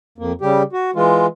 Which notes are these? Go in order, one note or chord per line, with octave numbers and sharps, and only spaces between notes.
F2 A#3
C#3 G3 G4
F#4
E3 G#3 F4